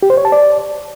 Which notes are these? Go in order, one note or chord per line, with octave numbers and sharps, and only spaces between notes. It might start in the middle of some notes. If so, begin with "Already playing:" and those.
G4
C5
C#5
A5
D5